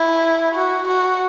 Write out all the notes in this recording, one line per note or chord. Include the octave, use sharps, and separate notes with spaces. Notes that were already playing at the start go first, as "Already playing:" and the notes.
Already playing: E4
F#4
F#4